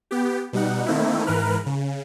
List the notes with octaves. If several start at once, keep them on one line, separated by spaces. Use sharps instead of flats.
B3 G4
B2 G3 D#4 F#5
D#3 A3 A#3 C4 D#4 E4
G#2 E3 A#4 B4 F6 F#6
C#3